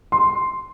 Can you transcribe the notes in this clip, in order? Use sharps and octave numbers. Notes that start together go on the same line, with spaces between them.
C6